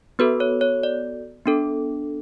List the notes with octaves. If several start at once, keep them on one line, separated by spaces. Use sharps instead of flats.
B3 F#4 A4 B4
C#5
C#5
D5
B3 D4 A4